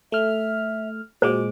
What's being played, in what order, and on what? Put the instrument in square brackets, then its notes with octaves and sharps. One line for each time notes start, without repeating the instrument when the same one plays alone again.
[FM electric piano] A3 F6 [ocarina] E5
[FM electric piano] A#2 G#3 D6 [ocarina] F#4 [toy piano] C5